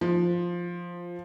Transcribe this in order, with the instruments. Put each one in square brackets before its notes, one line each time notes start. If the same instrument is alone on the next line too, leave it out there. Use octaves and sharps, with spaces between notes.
[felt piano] F3